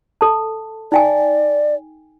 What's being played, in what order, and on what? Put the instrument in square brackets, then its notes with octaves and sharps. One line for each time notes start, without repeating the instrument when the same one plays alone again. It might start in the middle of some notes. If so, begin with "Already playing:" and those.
[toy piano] A4 A5
[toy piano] D#4 G5 G#5 [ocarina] D5